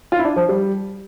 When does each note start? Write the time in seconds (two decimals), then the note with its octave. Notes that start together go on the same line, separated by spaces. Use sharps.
0.12 F4
0.19 E4
0.24 D4
0.36 F3
0.49 G3